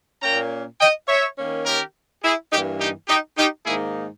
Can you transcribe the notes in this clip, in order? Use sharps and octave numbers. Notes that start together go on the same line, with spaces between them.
A#2 A#3 C#4 G5 A#5
D#5 G5
C#5 E5
D#3 A#3 C#4
G4 A#4
E4 G#4
G2 E3 A#3 D#4 G4
D#4 G4
D#4 G4
D#4 G4
G#2 D#3 A#3 D#4 E4 G#4